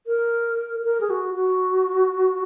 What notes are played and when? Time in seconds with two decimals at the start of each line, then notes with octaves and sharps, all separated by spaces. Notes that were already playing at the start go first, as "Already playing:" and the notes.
0.07 A#4
0.84 A#4
1.01 G#4
1.10 F#4
1.34 F#4